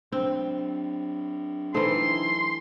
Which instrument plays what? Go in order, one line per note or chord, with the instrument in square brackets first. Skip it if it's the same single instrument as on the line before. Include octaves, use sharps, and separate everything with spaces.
[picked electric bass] F#3 D4 [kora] C4
[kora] E3 A3 [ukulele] D#4 A4 C5 [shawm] C6